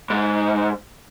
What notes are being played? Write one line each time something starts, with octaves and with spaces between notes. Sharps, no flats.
G#2